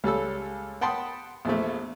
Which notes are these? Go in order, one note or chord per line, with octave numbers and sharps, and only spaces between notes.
C#2 G3 A4 E6
F#5 G5 A5 B5 C6 D#6
A#1 E2 F3 A3